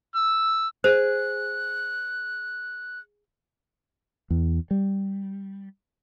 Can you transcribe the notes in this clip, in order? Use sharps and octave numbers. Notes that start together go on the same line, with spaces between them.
E6
G#4 C5 F#6
E2
G3